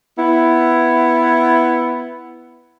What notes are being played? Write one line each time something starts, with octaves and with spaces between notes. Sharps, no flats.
B3 E4